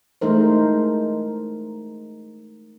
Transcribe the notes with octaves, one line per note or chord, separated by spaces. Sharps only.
E3 G#3 A3 D#4 A#4 C5